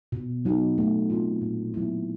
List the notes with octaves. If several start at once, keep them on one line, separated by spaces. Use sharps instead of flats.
B2
F#3 B3 D#4 F#4
A3
C4 F4
A#2
F#3 B3 E4